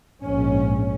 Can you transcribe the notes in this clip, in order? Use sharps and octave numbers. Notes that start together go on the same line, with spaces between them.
A#1 G#2 C#4